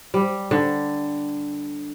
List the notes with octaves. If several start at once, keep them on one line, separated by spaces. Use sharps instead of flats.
G3
D3